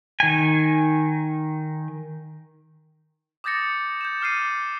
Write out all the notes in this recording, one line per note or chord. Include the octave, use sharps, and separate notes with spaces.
D#3 G#5
D6 D#6 G6 A6 A#6 C#7
G6 E7
D6 F6 C7 D#7